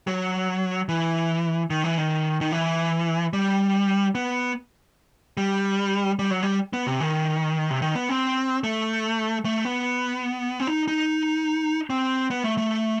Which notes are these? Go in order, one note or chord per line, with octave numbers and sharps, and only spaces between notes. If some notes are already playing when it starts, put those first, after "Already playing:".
F#3
E3
D#3
E3
D#3
D#3
E3
G3
B3
G3
G3
F#3
G3
B3
C3
D#3
C3
D#3
B3
C4
A3
A3
B3
C4
D#4
D#4
C4
B3
A3
A3